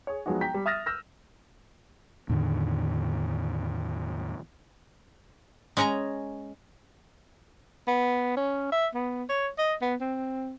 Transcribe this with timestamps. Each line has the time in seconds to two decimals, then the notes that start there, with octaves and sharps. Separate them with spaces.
0.07 G#4 C#5
0.26 F3 F#3 G#3 B3 D#4 F#4
0.41 G5 A#5 B6
0.54 G3
0.66 E5 D#6 F6 A6 A#6
0.86 E6 F6 G6 A#6
2.29 E2 A2 D3 D#3
5.77 G#3 C#4 C#5 D#5 A#5
7.88 B3
8.37 C#4
8.72 E5
8.94 B3
9.29 C#5
9.58 D#5
9.81 B3
10.00 C4